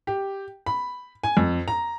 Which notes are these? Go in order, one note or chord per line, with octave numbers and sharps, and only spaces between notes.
G4
B5
G#5
F2
A#5